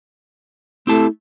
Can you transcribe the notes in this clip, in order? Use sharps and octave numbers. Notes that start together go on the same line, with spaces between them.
A3 C4 E4 G4 A5